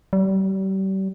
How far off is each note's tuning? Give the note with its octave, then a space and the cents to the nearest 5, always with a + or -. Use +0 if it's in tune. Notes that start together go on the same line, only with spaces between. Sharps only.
G3 -35